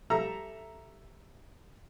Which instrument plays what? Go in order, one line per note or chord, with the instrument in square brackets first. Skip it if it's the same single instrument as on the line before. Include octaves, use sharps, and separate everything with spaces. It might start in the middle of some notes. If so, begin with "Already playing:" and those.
[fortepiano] G3 A4 E5 A#5 E6